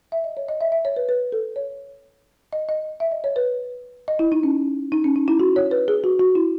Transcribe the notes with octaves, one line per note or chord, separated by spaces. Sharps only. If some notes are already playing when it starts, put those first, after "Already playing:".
E5
D#5
C#5
D#5
E5
E5
C#5
B4
B4
A4
C#5
D#5
D#5
E5
D#5
C#5
B4
D#5
E4
D#4
C#4
D#4
C#4
D#4
E4
F#4
C#5
B4
G#4
F#4
F#4
E4